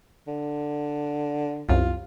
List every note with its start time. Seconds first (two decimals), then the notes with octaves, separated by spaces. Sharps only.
0.27 D3
1.69 C2 F#2 F4